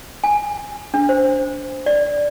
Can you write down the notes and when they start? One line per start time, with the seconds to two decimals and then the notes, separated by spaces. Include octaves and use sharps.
0.24 G#5
0.94 D4
1.09 C5
1.86 D5